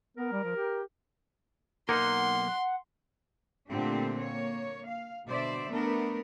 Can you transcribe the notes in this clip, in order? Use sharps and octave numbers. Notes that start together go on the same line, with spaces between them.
B3 A#4
G3
F3
G4
B1 A#3 D#4 A#4 F#5 C6
A#2 D3 A3 C4 D4 G4
A#3 C#5
F5
B2 D3 C5 D5 E5
A3 B3 D4 A#4